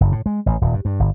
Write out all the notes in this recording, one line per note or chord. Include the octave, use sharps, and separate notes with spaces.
F#1
A2
G#3
A1
D#1
G2
G2
G1